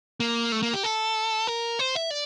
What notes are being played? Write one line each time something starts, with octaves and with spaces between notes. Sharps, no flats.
A#3
A3
A#3
G4
A4
A#4
C5
E5
D5